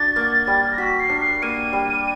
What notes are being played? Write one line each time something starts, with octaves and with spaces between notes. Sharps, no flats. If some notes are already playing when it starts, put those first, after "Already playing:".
Already playing: D4 F#4 A6
A#3
G3
A#6
F#4 B6
C7
D4
C7
A#3 D#7
G3